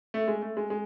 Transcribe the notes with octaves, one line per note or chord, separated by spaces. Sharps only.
A3
G#3
A3
G#3
G#3